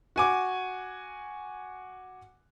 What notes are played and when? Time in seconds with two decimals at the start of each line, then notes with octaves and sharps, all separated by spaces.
0.16 F#4 G#5 D6